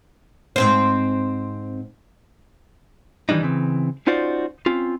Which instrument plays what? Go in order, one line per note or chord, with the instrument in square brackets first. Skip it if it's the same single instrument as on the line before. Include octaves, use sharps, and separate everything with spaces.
[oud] G#2 C4 C5
[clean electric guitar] D#3 E3 G3 D4 D#4
C#3 E3 C4
C#4 D#4 F4 F#4 C5 D5
C4 C#4 F4